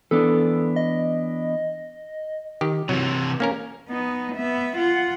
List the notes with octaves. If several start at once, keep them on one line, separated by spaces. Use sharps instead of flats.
E3 B3 D4 A4
D#5
D#3 G4
C3 E3 F#3
A#3 C#4 A#4
B3 D#4
B3 E5
F4 F#5